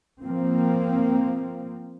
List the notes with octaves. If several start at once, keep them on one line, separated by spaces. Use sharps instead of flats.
F3 A#3 C4